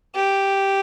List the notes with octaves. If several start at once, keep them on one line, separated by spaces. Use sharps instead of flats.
G4